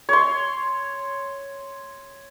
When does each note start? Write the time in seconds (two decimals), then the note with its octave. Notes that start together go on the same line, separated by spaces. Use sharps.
0.09 C#5 C6